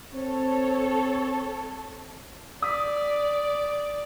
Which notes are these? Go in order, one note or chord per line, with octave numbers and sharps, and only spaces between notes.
C4 A4 C#5
D5 D#6 B6